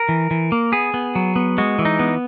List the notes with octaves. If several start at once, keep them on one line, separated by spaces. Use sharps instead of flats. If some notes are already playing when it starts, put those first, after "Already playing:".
Already playing: A#4
E3
E3
A#3
B3 G#4
B3
F#3
B3
G#3 F#4
E3
D#4
B3